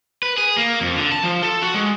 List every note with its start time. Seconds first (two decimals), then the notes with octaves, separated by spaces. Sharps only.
0.23 B4
0.38 G#4
0.57 A#3
0.81 F2
0.96 D3
1.12 A5
1.24 F3
1.43 A4
1.62 F#4
1.74 G#3